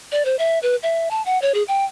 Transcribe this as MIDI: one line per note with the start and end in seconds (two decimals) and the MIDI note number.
0.12 0.25 74
0.25 0.36 72
0.39 0.59 76
0.63 0.76 71
0.83 1.09 76
1.11 1.22 81
1.26 1.40 78
1.42 1.52 73
1.54 1.63 68
1.68 1.85 79